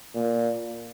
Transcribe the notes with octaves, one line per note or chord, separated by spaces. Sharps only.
A#2